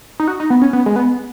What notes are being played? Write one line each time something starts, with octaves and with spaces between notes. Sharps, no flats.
D#4
F#4
D#4
B3
C#4
B3
G#3
B3